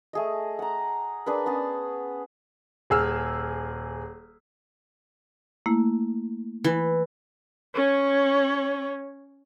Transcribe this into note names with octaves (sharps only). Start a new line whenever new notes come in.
A3 G#4 D#5
F#5 A#5
D4 G#4 A#4 B4
B3 C#4 G#4 A5
D#1 G#4 E6 F6
A3 A#3 E4
E3
C#4 C#5